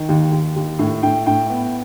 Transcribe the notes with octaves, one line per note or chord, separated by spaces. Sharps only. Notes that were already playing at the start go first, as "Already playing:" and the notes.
Already playing: D#3
D#2
D#2
D#2
A2
A2 G5
A2 G5
B3